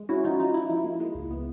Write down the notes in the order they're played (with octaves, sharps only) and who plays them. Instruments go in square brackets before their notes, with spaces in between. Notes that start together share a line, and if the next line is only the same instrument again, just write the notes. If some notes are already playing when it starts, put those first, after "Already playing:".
Already playing: [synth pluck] G#3
C#4 E4 F#4
F3 D#4 F4
F3 D#4
D#4 E4
F3 E4
A#3
G#3
C#2
B3